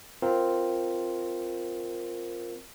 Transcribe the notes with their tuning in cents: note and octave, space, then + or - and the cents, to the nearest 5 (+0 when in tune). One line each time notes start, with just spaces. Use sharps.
C4 +0 F4 +0 A#4 +0